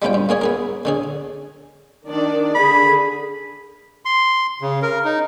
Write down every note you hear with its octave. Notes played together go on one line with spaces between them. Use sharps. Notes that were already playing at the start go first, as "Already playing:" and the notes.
G3 G#3 B3 C#4 F4 G5
G2
A#3 C#4 G#4 C#5
B3 G#4 A#4
D3 C#4 G#4
D#3 D4 D5
D3 G#4 B5
C6
C#3
A#4
D#4